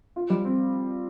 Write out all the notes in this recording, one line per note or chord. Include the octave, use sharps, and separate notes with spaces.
F4
G3
C4